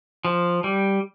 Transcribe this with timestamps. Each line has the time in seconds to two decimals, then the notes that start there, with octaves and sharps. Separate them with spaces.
0.25 F3
0.64 G3